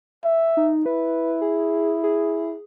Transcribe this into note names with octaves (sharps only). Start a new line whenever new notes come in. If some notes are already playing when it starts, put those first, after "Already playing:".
E5
D#4
E4 B4
G#4
G#4